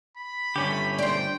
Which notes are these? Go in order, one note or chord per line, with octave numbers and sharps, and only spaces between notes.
B5
G2 D3 A3 C#4 G4
C5 D5 G5